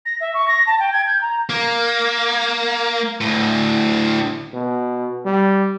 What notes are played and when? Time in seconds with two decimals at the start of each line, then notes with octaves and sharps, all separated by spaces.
0.06 A#6
0.20 E5
0.34 C#6
0.48 A#6
0.67 A5
0.80 G5
0.92 G#6
1.07 G6
1.21 A#5
1.50 A#3
3.21 D2 A2
4.53 B2
5.25 G3